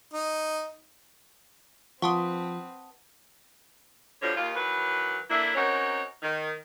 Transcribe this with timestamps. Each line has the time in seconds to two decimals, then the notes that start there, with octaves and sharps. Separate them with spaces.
0.13 D#4
2.02 F3 C4 B4 F#5 A5 C6 C#6 D#6
4.22 B2 D3 F3 G3 C#5
4.36 D#2 F4
4.55 D#3 E3 F#3 B4
5.30 D3 A#3 D4 E4
5.55 C4 C#4 D#4 F#4 A#4 C#5
6.23 D#3